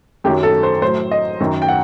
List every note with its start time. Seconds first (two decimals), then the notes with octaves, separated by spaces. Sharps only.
0.24 F#2 D#3 F#3 G4
0.43 A4
0.63 C5
0.82 A2 F#3 C5
1.11 D#5
1.40 F#2 D#3 F#3
1.62 G5
1.68 F#5